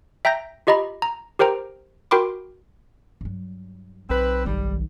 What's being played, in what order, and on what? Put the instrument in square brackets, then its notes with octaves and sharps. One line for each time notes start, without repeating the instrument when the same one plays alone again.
[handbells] E5 G5 A#5 G6 A#6
F4 G4 D#5 A#5 B5
A#5
G4 A#4 C5 G5 A#5
F#4 A#4 G5 B5 C6 D6
[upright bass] G2 F#3
[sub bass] B1 [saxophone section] C4 B4 [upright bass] F4
[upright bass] G1 D#3 [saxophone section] G3